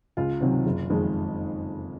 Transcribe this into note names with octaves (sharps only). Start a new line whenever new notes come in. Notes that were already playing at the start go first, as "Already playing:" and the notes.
C#2 F4
C3 D#3 F#3 C4
F#1
F2 D#3 G#3